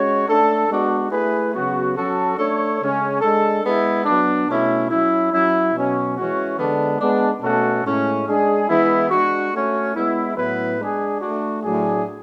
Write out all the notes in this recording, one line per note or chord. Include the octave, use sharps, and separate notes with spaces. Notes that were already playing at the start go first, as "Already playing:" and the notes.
Already playing: G#3 C#4 F#4 C#5
A3 D4 A4
G#3 B3 D4 F#4
A3 E4 G#4 B4
C#3 F#3 B3 F#4
F#3 C#4 F#4 A4
A3 D4 A4 C#5
C#3 G#3 C#4
G#3 D4 A4
G#3 B3 E4
F#3 B3 D4
B2 A3 C#4 E4
F#3 C#4 E4
F#3 C#4 E4
B2 F#3 C#4
E3 G#3 C#4 F#4
D3 G#3 B3 D4
G#3 B3 D4
B2 A3 C#4 F#4 A4
A2 G#3 C#4
G#3 D4 G#4
E3 G#3 B3 E4
G#3 D4 F#4
A3 C#4 F#4
G#3 B3 E4
A2 F#3 B3 E4 B4
G#3 D4 G#4
A3 D4 F#4
A2 F#3 A3 D4 G#4